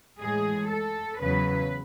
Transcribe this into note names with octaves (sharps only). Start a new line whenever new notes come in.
A2 E3 G#3 G#4
A4
E2 C#3 F#3 B4